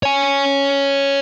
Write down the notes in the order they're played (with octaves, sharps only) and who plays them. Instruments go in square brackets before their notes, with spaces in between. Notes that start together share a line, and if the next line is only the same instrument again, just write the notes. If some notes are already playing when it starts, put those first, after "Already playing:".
[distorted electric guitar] C#5 G#5